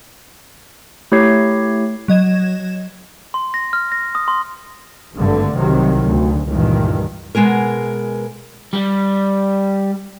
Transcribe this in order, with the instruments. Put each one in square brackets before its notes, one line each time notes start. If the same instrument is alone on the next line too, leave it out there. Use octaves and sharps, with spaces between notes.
[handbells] A3 E4 G4 C#5 G#6 C7
[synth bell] F#3 D#5 G#6 E7
[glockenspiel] C6
A#6
F6
A#6
D#6
C6
[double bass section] G#1 G2 D3 A3
C2 C3 D#3 F#3
D2
C#2 G2 A#2 D#3 E3
[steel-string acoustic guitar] B2 G#3 B3 G#4 A#4
[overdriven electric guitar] G3